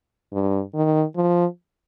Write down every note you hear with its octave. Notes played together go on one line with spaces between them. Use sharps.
G2
D#3
F3